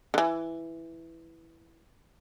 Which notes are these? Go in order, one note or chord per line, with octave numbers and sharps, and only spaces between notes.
D3 E3